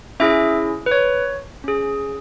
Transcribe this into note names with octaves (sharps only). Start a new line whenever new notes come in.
C#4 E4 G#4 E5
B4
C#5
C#4 G#4